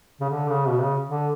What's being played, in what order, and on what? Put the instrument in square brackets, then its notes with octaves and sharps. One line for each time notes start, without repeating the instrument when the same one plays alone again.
[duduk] C#3
D3
C#3
B2
C#3
D3